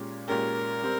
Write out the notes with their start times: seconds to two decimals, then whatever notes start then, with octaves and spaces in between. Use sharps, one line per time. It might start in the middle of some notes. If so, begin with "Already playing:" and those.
Already playing: A#2 G#3 C#4 G4
0.28 A#2 G#3 C#4 G4 A#4
0.82 G3 C4